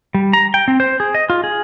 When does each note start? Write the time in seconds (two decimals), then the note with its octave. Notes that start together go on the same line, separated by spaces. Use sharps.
0.15 G3
0.33 A#5
0.54 G5
0.68 C4
0.80 C5
1.00 G#4
1.15 D#5
1.30 F4
1.44 G#4